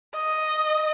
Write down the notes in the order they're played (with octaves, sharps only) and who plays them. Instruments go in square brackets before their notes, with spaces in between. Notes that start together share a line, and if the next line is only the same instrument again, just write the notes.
[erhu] D#5